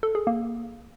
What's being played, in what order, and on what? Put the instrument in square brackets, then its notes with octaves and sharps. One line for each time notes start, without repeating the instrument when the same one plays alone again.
[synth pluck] A4
G#4
A#3